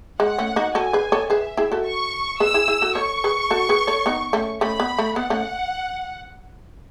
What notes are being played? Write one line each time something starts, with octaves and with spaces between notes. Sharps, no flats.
G#3 F#5
A3 C#4
D#4 F#4
F#4 A4 G#5
G#4 B4
A4 C#5
G#4 B4 E5
E4 G#4
F#4 A4
C#6
G#4 B4 E6
E4 G#4
E4 G#4
F#4 A4
A4 C#5 C#6
G#4 B4
F#4 A4
G#4 B4
A4 C#5
B3 D#4
A3 C#4
A3 C#4 B5
B3
A3
B3 F#5
A3 C#4